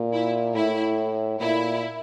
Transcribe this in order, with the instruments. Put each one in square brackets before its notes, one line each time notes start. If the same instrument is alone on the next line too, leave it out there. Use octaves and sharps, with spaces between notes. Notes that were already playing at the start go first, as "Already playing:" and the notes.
Already playing: [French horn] A#2
[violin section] E4
[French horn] A2 [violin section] E4
[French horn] A#2 [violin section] E4